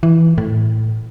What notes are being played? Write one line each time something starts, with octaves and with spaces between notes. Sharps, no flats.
E3
A2